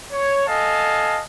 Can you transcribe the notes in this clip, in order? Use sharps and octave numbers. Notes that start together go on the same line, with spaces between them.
C#5
A4 D#5 F5 G#5 A5